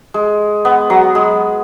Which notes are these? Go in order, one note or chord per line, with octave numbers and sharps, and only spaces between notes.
G#3
B3
F#3
G#3